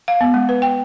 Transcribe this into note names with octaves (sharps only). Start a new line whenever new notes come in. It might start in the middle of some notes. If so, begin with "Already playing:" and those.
F5
B3
G#3
B4
G5